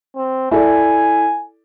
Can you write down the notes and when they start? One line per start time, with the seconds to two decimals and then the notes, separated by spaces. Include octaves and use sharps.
0.16 C4
0.51 E4 A4 D5 G#5